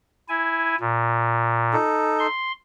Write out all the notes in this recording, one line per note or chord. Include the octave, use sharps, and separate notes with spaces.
E4 G#5
A#2
D#4 A4
C6